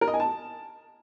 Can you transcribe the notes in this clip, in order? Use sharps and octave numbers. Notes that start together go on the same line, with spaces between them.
A#4
D#5
G#5
A5